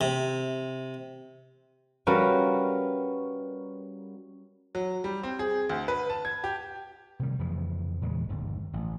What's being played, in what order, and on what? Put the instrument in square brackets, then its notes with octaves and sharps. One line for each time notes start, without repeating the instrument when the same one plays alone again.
[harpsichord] C3
[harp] G3 C#4 F#4 A#4 B4 F5
[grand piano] F#3
G3
C4
G#4
D2
B4
A5
G#6
G4
[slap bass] C3 D#3 G3
F2 C#3 E3 F3
E2 A#2 C#3 G#3
G1 D#2 G#2
A1